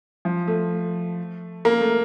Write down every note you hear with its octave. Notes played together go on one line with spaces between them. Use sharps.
F3
A3
A#3
A3